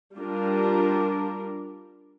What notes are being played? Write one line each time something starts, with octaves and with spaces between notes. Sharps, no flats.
G3 D4 F4 A#4